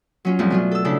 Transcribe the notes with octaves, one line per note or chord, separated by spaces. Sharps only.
F#3 C#4 F4
F2 A2 G3 A3 C4 E4
B2 F#3 F4
A4 E6
C#3 D4 E4 A4